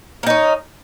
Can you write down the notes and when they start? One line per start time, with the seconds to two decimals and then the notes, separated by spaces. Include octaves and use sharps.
0.23 A#3
0.27 D#4
0.30 C#4